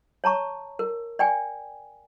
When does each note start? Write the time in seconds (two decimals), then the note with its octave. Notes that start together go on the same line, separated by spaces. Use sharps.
0.24 C#5 A5 A#5 C#6
0.79 A#4
1.19 D5 G5 G#5